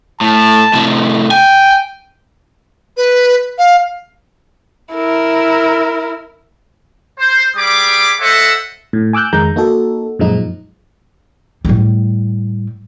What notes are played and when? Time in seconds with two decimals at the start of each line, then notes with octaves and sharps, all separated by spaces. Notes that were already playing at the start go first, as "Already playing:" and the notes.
0.21 A2 A5
0.74 A2 C3
1.31 G5 G#5
2.97 B4
3.58 F5
4.94 E4 A#4
7.18 C5
7.57 G3 G#4 B5 D6
8.20 A4 C5 D#5 E5 F#5
8.93 A2
9.13 G#5 D6 E6 F#6 G6
9.33 F2 D#3 G#3 A#5 G6
9.56 A#3 D#4 F#4 A4
10.19 F#2 A#2 F3 G#3 D#4
11.65 A2 G3